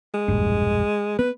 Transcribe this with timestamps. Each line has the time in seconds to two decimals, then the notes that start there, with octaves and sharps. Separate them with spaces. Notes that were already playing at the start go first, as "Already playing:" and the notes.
0.14 G#3
0.28 E1 A#1 G2
1.19 B3 B4